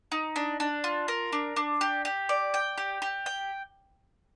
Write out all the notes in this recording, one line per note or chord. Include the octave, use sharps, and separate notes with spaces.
D#4
D4
D4
F4
A#4
D4
D4
G4
G4
D5
G5
G4
G4
G5